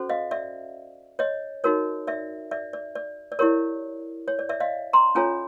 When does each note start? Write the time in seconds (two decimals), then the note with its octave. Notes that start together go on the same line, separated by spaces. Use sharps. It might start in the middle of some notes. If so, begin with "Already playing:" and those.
Already playing: C#4 F#4 A4 C5
0.09 D#5 F5
0.31 D5 E5
1.19 C#5 D#5
1.64 D#4 F#4 A#4 C#5
2.07 D5 E5
2.51 D5 E5
2.73 D5
2.95 D5
3.32 D5
3.39 E4 G4 A#4 C#5
4.28 C#5
4.39 D5
4.49 D5 E5
4.60 D#5 F5
4.93 A#5 C6
5.15 C#4 F4 A4 C#5 G#5 A#5